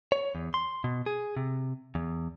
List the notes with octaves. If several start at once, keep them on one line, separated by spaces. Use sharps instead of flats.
C#5
E2
C6
B2
G#4
C3
E2